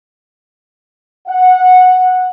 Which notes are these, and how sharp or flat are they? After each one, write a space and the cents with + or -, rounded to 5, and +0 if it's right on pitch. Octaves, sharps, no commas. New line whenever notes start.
F#5 -10